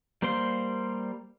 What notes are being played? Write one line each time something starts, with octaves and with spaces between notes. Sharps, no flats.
G3 A#3 C5 F5 C6